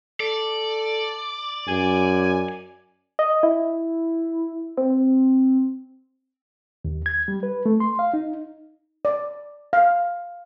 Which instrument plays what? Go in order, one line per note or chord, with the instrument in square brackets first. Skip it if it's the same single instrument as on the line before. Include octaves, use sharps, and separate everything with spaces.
[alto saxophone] A4 [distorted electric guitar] D5
[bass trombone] F#2 [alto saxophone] G#5
[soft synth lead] D#5
E4
C4
[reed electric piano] D#2
G#6
G3
B4
A3
C6
F5
D#4
[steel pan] D5
F5